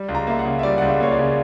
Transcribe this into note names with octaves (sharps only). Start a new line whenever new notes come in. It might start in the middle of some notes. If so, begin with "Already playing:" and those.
Already playing: G3
C#2
A#5
A#3 E5
F#5
C#3
E5
G3 D5
C#2 F#5
E5
A#3 C#5
D5
C#3